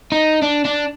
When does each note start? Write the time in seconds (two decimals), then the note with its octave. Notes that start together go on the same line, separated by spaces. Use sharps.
0.12 D#4
0.42 D4
0.65 D4